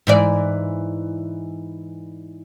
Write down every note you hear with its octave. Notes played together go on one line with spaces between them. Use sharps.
G#2 E3 D5